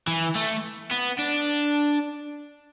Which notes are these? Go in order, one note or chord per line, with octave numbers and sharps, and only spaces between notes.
E3
A3
B3
D4